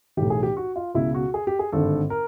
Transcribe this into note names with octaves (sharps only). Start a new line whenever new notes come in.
B1 A2 E3 G4
G#4
G4
F#4
F4
C#2 B2 E4
F#4
G#4
G4
G#4
G#1 G2 D3 A4
A#4